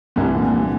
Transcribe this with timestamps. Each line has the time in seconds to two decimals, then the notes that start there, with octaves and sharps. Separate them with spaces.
0.16 C2 D3 E3
0.35 A#2
0.53 C2